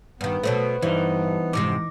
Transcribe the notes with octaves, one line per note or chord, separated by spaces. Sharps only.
G2 D#3 B3
B2 F#3 A3 C5
G2 E3 D#4 C5 E5
F2 G#2 C3 D6 A#6